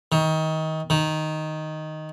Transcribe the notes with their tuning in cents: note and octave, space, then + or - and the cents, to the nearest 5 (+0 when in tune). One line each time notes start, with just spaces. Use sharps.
D#3 +25
D#3 +0